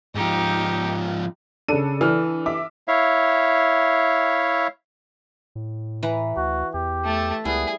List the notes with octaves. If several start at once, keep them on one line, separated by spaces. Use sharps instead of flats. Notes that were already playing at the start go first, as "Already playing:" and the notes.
G#2 F3 D#4 G4
C#3 D4 A4 D#7
E3 F6
E5 D6
E4 C#5 E5 F5
A2
E3 B4 A#5
D2 F#4
E2 G4
A3 A5
C#2 G3 B3 E4 G#4